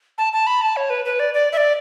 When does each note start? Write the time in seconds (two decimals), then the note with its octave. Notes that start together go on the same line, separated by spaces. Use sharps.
0.18 A5
0.33 A5
0.47 B5
0.62 A5
0.77 C#5
0.90 B4
1.05 B4
1.19 D5
1.34 D5
1.53 E5
1.57 D5